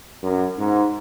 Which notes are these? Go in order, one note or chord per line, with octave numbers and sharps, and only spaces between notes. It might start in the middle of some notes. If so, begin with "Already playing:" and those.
F#2
G#2